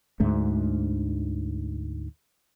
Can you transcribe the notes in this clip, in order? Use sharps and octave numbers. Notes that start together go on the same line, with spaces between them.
D2 G#2 D3 A3